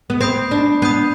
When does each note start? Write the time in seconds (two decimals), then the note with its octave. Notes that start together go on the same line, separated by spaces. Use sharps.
0.10 B3
0.21 C4 B5 D#6 G6 C7
0.51 D4
0.82 B3 B5 D#6 G6 C7